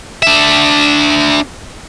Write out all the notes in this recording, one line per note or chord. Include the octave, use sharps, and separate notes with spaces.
D4 E5